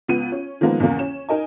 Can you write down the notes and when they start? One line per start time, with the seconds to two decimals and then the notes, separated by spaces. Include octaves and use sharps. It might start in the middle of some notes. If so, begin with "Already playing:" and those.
0.08 C#2 B3 D#7
0.32 C#4
0.61 D#3 F3 G#3 A#3 B3
0.80 E2 C#3 A#3
0.99 C#4 E7
1.29 D#4 A#4 D#5 G#5